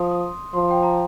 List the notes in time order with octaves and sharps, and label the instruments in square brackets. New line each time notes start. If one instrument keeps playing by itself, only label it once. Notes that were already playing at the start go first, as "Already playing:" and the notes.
Already playing: [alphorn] F3 [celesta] C6 D#6
[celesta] D#6
[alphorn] F3 [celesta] C6
[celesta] G5
A#5